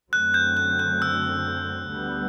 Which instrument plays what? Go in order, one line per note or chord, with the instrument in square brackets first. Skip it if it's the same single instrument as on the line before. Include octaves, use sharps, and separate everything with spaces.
[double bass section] F#2 D3 F#3 A3 C4 [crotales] F#6
[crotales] G6
F#6
F#6
E6
[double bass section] D2 D3 G3 B3